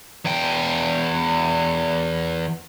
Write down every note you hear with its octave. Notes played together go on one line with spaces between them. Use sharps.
E2 G5